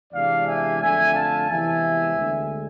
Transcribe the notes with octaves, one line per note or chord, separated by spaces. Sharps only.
E2 C3 G#3 D4 D5 F5
E5 G#5
F2 D3 A3 E5 G#5
F5 A5
E2 C3 E3 G#3 E5 G#5
D2 D3 G#3